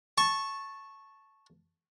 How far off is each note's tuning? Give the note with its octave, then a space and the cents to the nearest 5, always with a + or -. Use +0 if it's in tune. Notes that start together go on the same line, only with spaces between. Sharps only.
A5 +0 C#6 -10